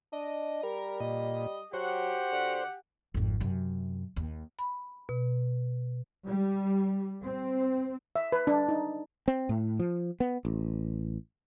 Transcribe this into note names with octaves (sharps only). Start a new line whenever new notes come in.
D4 D#5
G3 A#4
A#2 D#5
F#3 F#4 G4 C5 F#5
D3
G#1 F2
F#2 C3
D#2
B5
B2
G3
C4
E5
B4
D4
D#4
C4
A2
F3
B3
A1